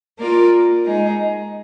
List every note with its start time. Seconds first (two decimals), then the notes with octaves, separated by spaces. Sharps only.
0.18 A#3 F4 A#4 D5
0.85 G#3 D#4 G#4